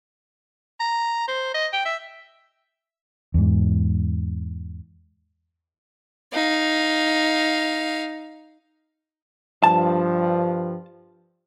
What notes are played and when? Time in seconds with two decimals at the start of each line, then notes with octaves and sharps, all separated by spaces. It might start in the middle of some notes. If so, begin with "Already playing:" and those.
0.80 A#5
1.28 C5
1.54 D#5
1.73 G5
1.85 E5
3.34 E2 G#2
6.33 D#4 F5
9.64 G2 F3 A5